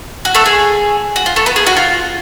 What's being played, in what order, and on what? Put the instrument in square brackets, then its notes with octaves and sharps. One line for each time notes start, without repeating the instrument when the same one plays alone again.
[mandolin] F#4
A3 A4
G#4
F#4
F4
A3 A4
B3 B4
G#4
F#4
F4